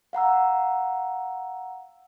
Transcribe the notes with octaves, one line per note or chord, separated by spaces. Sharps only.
F5 F#5 A#5 E6